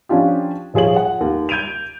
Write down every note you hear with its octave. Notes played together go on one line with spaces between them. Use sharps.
F3 C#4 D4 F4 G4
D#1 F3 G#4 C#5 F#7
F#5
D#2
G6 G#6 D7 D#7 F7